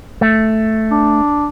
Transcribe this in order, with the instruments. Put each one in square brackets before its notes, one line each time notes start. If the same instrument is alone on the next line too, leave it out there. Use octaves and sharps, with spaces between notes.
[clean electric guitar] A3
[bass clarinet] D4